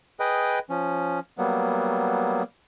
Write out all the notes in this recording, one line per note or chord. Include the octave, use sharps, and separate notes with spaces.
G#4 B4 D#5 G5
F3 C#4
F#3 G3 A#3 B3